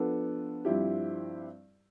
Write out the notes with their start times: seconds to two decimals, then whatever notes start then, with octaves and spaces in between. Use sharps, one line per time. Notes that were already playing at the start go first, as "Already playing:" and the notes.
Already playing: F3 B3 D4 A4
0.65 G2 F3 C4 E4 G4